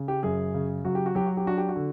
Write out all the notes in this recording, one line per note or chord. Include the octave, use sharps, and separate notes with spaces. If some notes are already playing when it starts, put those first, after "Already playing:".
Already playing: C#3
G4
F#2 G#4
C#3
F#3 F#4
G4
F#4
F#3 G4
F#4
G4
D4 F#4
G4
F#4
D3